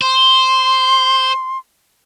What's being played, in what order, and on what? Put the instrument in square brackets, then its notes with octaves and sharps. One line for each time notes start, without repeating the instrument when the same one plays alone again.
[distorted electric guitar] C5 [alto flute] C6